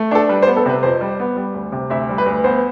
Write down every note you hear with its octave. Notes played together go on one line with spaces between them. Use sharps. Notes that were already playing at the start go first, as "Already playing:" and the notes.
Already playing: A3
D4 A4
G3 B4
C5
B3
A4
C3 B4
F2 C5
G3
B3
G3
D2
C3
D2 E5
G3
B4
D2
B3 C5